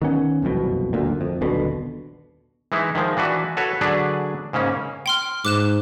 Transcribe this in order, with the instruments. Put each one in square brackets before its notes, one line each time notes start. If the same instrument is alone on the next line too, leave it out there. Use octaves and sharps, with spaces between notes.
[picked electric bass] D#3 B3 C#4
F#1 C2 F2 B2
F#1 D2 A#2
F2
D#1 B1 B2 D3
[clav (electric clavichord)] E3 G#3 D#4 E4
D#3 F3 G#3
E3 D4 F#4 B4
F#4 A4 B4 C#5
D3 F#3 D4 G#4 B4 D5
G#2 C#3 A#3 C#4
[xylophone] G5 C6 F6
[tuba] G#2 [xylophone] D6 F#6 E7